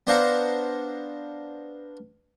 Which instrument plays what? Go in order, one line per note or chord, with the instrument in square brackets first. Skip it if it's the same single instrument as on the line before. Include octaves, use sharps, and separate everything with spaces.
[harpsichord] B3 D4 C5 F5 F#5 A#5